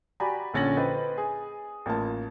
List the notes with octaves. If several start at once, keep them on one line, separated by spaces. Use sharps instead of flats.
F#4 G4 D5 G#5 A#5 B5
A#1 D3 C#4 A6 A#6 F#7
B4 C5 D#5 G5 B5
G#4
A1 A#3 F4 A5